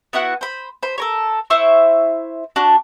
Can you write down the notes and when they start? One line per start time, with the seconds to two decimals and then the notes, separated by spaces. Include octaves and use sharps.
0.13 B3 E4 F#4 F#5
0.41 C5 B5
0.83 C5 B5
0.98 A4 A#4 C#5
1.50 E4 C5 E5 C#6
2.56 D4 F#4